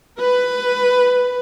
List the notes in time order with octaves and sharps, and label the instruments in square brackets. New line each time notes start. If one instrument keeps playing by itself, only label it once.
[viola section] B4